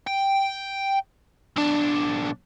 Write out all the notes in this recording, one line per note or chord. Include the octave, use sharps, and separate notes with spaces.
G5
B1 D4